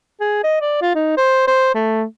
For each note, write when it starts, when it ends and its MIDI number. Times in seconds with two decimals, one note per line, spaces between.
0.21 0.39 68
0.44 0.59 75
0.61 0.78 74
0.82 0.95 65
0.95 1.14 63
1.17 1.43 72
1.48 1.72 72
1.74 2.04 57